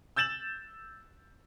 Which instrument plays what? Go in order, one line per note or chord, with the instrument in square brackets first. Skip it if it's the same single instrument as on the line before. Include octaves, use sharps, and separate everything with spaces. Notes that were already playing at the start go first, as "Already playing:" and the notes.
[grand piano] E6 G6 A6 E7 F#7